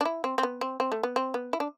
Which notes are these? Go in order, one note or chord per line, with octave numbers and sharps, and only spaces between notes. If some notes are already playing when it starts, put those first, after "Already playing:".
D4
E4
C4
C4
B3
C4
C4
A3
B3
C4
B3
E4
D4